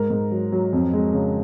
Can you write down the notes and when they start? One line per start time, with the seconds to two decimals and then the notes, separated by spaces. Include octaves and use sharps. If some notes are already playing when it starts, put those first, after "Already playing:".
Already playing: G#2 A#4
0.10 G#2
0.31 F#3
0.52 F#3
0.73 F2
0.93 G#3
1.13 C#3